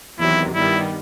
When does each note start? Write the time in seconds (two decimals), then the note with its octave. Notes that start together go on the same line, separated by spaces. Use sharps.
0.19 E2 C3 D#3 F#3 E4
0.54 G2 D#3 G3 B3 E4